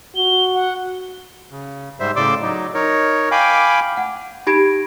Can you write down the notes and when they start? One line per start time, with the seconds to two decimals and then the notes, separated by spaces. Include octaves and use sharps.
0.16 F#4 G7
0.55 F#5
1.51 C#3
2.00 G#2 G3 C5 E5
2.16 A2 C#3 D5 C6 D6 E6
2.42 F#3 D#4
2.74 D#4 A#4 C#5
3.31 F5 G5 G#5 B5 D6
3.97 F#5
4.47 D#4 G4 B5 G#6 A#6 D7